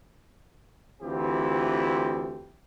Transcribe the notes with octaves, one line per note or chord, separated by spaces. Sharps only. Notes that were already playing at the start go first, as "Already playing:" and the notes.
D2 E3 C4 F4 G4